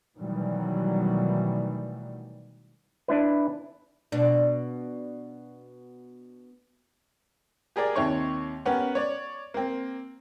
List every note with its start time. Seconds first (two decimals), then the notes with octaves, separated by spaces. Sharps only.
0.17 B2 D#3 E3 F#3 G3 A3
3.08 D4 E4 B4
4.12 B2 D4
7.76 G4 G#4 A#4 D5 G5
7.96 D#2 C3 C#5 C#6
8.66 B3 C#4 G4 A#4 F#5
8.95 C#5 D5
9.54 A#3 C4